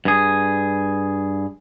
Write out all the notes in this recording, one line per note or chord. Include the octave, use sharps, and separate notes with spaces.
G2 G#4